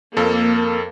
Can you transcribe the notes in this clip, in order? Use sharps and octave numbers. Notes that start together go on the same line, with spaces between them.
F2 A#3 A4